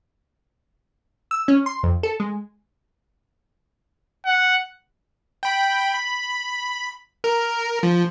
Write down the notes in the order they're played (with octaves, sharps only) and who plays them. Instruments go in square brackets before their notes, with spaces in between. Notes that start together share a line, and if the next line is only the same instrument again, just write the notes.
[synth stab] E6
C#4
C6
F2
A4
G#3
[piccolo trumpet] F#5
[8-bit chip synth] G5 B5
B5
A#4
F3